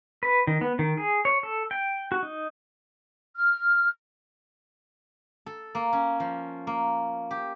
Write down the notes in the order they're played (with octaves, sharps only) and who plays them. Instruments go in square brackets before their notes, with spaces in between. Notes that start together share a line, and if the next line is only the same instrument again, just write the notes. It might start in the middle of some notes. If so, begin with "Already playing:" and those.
[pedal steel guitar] B4
D#3
B3
D#3
G#4
C#5
A4
G5
F#4
D#4
[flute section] F6
[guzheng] A4
A#3
C#4
F3
A#3
G4